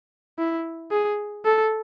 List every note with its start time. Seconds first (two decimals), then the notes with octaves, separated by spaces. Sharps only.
0.39 E4
0.92 G#4
1.45 A4